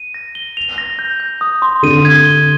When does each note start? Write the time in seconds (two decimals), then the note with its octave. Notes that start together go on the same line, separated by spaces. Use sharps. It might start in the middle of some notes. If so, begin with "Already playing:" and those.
Already playing: D#7
0.14 A#6
0.35 G7
0.57 F7
0.78 A#6
0.99 G6
1.20 G6
1.41 D#6
1.62 C6
1.83 D3 D#7
2.05 G#6
2.25 G7